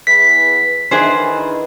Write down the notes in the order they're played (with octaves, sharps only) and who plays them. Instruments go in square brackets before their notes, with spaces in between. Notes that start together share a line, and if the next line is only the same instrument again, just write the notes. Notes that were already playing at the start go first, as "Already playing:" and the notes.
[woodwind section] E2 E3 [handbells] B6
[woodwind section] D#3 E3 [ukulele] D4 G#4 C5